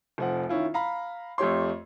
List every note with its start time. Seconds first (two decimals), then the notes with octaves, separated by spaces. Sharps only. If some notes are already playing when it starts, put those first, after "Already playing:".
0.18 F1 F3 F#5
0.49 D#3 C#4 E4 F4
0.74 F5 A#5 B5
1.38 F2 A3 G4 C#5 C6